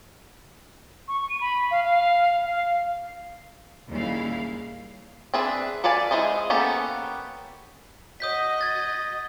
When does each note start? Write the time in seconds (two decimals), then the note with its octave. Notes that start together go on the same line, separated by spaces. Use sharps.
1.08 C#6
1.29 D#7
1.41 B5
1.71 F5
1.84 F5
2.46 F5
3.90 D#2 A#2 C#3 G3 E4 F5
5.34 C4 D4 G#4 B4 E5
5.84 A4 B4 D5 F5 G#5
6.11 G#3 E4 G#4 C5 D#5
6.50 A#3 B3 C#4 G4 A4
8.20 F#4 D#5 D#6 G6 B6
8.61 G#6 A6